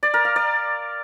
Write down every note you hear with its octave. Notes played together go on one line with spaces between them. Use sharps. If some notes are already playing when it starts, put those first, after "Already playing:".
D5
A#4
F5
D5